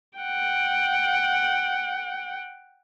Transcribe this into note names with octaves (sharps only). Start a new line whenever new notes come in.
F#5 G5